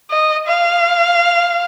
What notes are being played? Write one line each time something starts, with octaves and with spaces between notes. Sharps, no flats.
D#5
F5